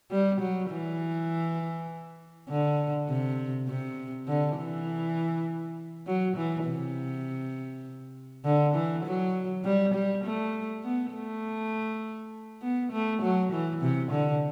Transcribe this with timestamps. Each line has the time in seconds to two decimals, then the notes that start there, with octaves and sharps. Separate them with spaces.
0.11 G3
0.40 F#3
0.70 E3
2.49 D3
3.09 C3
3.68 C3
4.28 D3
4.58 E3
6.06 F#3
6.37 E3
6.66 C3
8.45 D3
8.75 E3
9.05 F#3
9.65 G3
9.94 G3
10.24 A3
10.84 B3
11.14 A3
12.62 B3
12.92 A3
13.22 F#3
13.52 E3
13.81 C3
14.12 D3